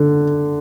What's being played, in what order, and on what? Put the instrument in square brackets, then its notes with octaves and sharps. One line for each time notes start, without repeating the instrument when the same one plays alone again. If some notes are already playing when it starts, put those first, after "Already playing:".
Already playing: [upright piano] D3